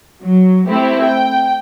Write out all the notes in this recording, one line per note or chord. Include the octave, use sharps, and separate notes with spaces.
F#3
A3 C4 E4 G4
G5